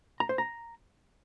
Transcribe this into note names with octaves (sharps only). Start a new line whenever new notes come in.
A#5
C5
A#5